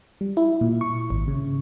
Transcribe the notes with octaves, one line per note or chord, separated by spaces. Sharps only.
G3
E4
A#2
C#6
G#1
C#3